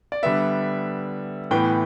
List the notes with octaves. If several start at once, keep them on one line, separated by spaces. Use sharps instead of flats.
D5
D3 G3 B3 E5
A2 E3 B3 G5